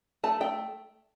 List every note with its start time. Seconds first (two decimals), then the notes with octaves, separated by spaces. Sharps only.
0.24 A3 A5
0.41 A3 G5